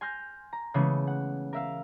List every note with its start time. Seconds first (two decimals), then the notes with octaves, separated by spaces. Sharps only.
0.01 G#5 C6 F6 G6 A#6
0.53 A#5
0.74 C#3 E3 G#3 A3 B3
1.07 F#5
1.53 A#4 E5 F5